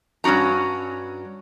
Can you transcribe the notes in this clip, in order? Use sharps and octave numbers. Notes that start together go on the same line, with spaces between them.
G2 C#4 D4 F#4 A#5